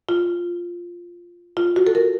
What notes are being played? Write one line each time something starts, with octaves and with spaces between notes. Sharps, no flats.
F4
F4
F#4
A4
A#4